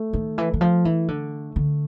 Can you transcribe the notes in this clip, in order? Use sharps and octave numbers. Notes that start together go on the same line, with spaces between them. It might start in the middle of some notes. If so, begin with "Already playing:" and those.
Already playing: A3
D#3
E3
E3
F3
E3
D3
D3